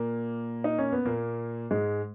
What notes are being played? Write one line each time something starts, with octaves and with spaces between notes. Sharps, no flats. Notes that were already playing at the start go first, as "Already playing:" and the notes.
Already playing: A#2 A#3
D#4
C#4
B3
A#2 A#3
G#2 G#3